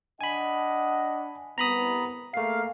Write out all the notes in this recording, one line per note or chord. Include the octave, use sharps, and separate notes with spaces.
D4 D#5 F#5 G#5 B5
C2 B3 A#5 B5 D#6
A3 A#3 G#4 F5 C7